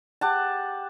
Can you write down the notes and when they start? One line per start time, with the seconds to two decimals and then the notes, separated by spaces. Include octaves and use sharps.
0.21 G4 F#5 A5